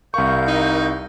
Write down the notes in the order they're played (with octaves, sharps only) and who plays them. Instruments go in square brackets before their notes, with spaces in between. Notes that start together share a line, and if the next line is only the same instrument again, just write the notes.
[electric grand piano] C2 C#6 [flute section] A#4 F5 G6
[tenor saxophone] D#4